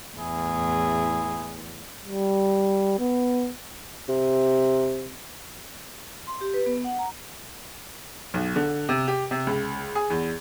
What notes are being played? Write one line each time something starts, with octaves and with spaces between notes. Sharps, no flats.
E2 A2 E4 G#4
G3
B3
C3
C6
G4
B4
B3
F#5
A#5
B1
D3
C3
G4
C3
C#2
G#4
E2